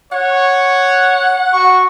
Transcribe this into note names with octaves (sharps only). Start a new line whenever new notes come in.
C#5 F#5
F#4 C#6